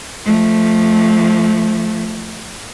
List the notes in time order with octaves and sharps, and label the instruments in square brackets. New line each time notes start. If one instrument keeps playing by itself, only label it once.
[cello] F3 A3